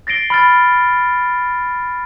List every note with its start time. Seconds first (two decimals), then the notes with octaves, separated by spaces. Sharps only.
0.07 A6 A#6 C7 D7 G7
0.30 B5 F6 A6